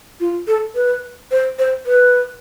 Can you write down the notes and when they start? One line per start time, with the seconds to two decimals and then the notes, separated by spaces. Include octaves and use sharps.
0.20 F4
0.48 A4
0.75 B4
1.31 C5
1.59 C5
1.86 B4